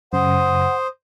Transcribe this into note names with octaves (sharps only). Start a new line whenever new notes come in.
F#2 C#3 C5 F#5 D#6